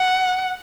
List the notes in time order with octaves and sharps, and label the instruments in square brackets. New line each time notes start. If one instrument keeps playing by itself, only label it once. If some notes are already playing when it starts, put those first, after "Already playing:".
Already playing: [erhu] F#5